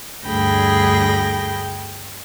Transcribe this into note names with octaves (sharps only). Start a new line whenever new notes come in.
D2 G2 G#4 G5 B5 A#6